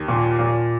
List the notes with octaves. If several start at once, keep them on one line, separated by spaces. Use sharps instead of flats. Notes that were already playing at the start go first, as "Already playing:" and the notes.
Already playing: D#2
A#2
A#2